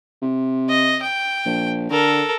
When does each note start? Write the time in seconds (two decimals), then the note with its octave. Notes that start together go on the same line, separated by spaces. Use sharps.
0.22 C3
0.69 D#5
1.02 G5
1.45 A#1
1.91 D3 A4 A#4